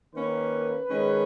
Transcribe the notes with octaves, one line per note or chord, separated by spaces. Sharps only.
D#3 A#3 C#4 B4
D#3 G#3 C#4